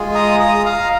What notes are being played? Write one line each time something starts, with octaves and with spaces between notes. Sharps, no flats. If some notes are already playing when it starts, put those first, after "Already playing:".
Already playing: G#3 F4 G#4
A#5 D#6
A#5 D#6
F5 A#5